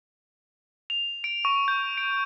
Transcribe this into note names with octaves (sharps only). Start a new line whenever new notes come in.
F7
D7
C#6
G6
D7